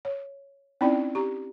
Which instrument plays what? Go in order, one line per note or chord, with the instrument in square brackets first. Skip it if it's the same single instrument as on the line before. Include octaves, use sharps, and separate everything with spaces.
[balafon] C#5
C4 C#4 D#4 E4 D5 G5
G4 A#5